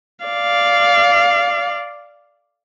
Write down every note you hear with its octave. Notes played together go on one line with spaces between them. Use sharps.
D5 F5